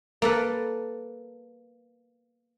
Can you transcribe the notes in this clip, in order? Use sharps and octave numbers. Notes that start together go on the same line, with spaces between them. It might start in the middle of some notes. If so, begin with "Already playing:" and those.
A#3 A4 B4